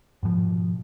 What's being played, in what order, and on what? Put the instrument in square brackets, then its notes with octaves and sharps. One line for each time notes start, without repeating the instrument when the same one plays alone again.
[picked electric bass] G#2 B2 F3